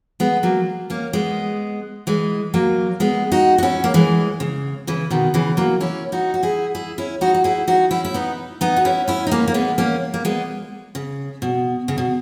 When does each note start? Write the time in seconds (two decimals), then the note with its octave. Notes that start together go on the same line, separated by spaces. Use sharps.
0.20 G#3 B3
0.43 F#3 A#3
0.90 A#3 C#4
1.13 G#3 B3
2.07 E3 G#3
2.54 F#3 A#3
3.00 G#3 B3
3.32 D#4 F#4
3.58 F#4
3.63 C#4 E4
3.84 A#3
3.94 E3 G#3
4.40 C#3
4.87 C#3 E3
5.10 B2 D#3
5.34 C#3 E3
5.57 F#3 A#3
5.80 C#4 E4
6.12 D#4 F#4
6.34 F#4
6.43 E4 G#4
6.75 E4 G#4
6.98 C#4 E4
7.21 D#4 F#4
7.34 F#4
7.44 E4 G#4
7.68 D#4 F#4
7.91 C#4 E4
8.05 E4
8.14 B3 D#4
8.61 B3 D#4
8.76 F#4
8.85 C#4 E4
9.08 C#4 E4
9.27 D#4
9.31 A#3 C#4
9.48 A#3
9.54 G#3 B3
9.78 A#3 C#4
10.14 A#3
10.25 G#3 B3
10.95 C#3
11.42 B2
11.88 C#3
11.98 B2